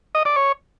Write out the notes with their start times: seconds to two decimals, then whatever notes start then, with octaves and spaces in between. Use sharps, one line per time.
0.15 D#5
0.25 D5
0.36 C#5